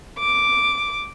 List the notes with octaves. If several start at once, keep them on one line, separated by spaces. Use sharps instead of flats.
D6